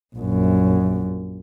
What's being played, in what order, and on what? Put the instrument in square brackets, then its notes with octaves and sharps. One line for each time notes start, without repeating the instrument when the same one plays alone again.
[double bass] A#1 F#2